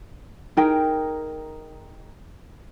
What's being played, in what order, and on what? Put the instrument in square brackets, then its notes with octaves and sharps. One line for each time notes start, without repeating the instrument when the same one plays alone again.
[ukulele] D#4 G#4 A#4 G5